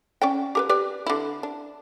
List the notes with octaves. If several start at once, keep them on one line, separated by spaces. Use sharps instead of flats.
C#4 D5 G5
G4 A#4 B4
G4 B4 D5
D3 E4
D4